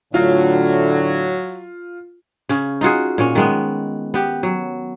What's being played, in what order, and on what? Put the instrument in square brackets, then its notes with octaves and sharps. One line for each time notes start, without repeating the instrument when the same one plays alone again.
[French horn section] A2 D3 [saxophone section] F#3 [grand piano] F4
[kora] C#3 C#4
D#4 F4 F#4 G#4
A#2 C#4
D#3 G#3 B3
B3 G4
F#3